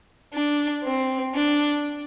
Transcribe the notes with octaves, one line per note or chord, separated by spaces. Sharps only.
D4
C4
D4